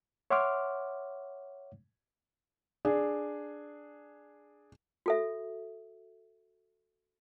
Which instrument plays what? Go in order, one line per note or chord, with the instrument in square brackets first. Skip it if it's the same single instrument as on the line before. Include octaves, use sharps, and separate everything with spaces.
[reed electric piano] C#5 E5 F#5 C6 D6 F6
[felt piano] D4 G#4
[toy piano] F#4 A4 E5